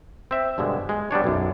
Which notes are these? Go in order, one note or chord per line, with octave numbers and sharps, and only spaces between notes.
C4 E5
G2 B2 D3 G#3
G#3
G3 B3 D4 C#5
B1 F#2